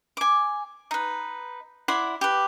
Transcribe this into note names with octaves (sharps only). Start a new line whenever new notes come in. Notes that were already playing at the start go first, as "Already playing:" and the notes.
G#5 D6
D#4 B4
E4 D5 F#5 C6
G4 B4